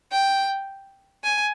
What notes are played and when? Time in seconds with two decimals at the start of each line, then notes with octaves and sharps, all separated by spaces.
0.12 G5
1.24 G#5